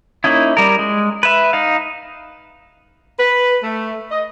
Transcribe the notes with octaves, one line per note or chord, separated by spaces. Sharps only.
A#3 C#4 D#4 E4
G3 A#4
G#3
B4 E5
D#4 F5
B4
A3
D#5